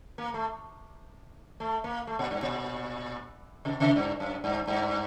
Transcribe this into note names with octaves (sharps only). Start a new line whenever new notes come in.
A#3
A3
A3
A#3
A3
A#2
G2
A#2
C3
C3
G2
F#2
G2
G2